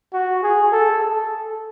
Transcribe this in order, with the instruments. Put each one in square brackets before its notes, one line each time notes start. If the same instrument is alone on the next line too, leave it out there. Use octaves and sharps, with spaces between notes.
[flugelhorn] F#4
G#4
A4
A4